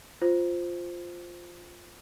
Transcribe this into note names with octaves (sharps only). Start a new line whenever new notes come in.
F4 C5